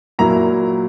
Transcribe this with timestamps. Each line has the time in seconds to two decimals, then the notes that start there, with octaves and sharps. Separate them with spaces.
0.19 A#2 F#3 A#3 E4 A#5